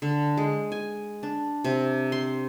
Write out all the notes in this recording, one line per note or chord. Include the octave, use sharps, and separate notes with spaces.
D3
G#3
G#5
D4
C3
C6